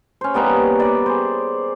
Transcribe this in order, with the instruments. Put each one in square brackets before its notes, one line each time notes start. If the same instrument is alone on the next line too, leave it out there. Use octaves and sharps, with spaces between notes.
[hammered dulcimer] C#4 C5
G3 A#3 B3 D#4
D5 B5
G#4 C5